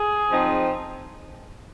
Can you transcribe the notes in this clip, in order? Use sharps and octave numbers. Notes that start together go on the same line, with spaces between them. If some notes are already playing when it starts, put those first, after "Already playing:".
Already playing: G#4
F3 C4 D#4